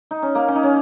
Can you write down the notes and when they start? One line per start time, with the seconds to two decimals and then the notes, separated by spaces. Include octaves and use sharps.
0.11 D#4
0.22 C#4
0.35 A#3
0.48 C#4
0.56 D#4
0.63 C#4